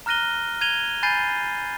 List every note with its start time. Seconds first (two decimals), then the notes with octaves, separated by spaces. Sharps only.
0.06 A#5 F6 F#6 A#6 D#7 G7
0.61 G#6 D#7 F7 G7
1.03 G#5 B5 G6 A6 C7 D#7